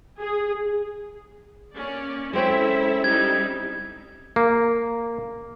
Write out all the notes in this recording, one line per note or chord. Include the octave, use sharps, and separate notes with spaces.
G#4
A#3 C#4 D5
G#3 C4 C#4 E4 A4 E5
G3 D#4 E4 G#6
A#3